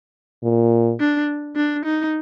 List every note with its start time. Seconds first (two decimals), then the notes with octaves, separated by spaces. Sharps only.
0.43 A#2
1.00 D4
1.56 D4
1.86 D#4